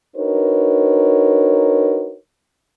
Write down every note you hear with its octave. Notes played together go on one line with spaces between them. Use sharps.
D4 D#4 F#4 A#4 B4 C#5